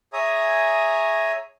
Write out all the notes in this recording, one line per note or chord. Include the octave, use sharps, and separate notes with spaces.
G#4 C#5 E5 G#5 A#5 D#6